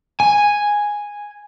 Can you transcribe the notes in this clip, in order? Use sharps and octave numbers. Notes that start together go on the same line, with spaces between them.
G#5